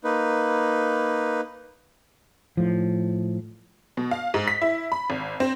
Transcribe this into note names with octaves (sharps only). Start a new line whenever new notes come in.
A#3 D#4 B4
A2 F3
B2
F5
G#2
B6
E4
B5
G#1
C4